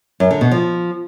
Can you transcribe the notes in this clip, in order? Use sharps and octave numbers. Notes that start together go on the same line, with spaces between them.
F#2
D3
B2
F3